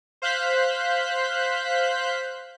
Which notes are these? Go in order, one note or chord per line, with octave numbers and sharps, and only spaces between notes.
C5 F5 F#6 G6 B6